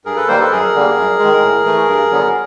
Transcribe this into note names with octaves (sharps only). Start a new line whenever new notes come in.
G2 G#4 A#4
A4 B4
D#3 G3 A#3 A#4 C5
A4 B4
F#2 G#4 A#4
D3 G3 A#3
F#2
D#3 G#3
A2
E3 A3
G2
D3 F#3 B3